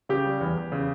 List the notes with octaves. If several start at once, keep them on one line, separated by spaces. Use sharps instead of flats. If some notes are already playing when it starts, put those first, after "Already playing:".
C#3 G4
G3
E2
E2
C#3